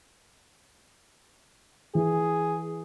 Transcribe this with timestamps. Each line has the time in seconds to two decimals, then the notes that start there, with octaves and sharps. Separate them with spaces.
1.95 E3 G#4